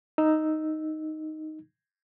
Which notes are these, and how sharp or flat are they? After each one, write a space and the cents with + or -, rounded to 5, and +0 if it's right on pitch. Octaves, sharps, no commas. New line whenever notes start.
D#4 +0 E6 -5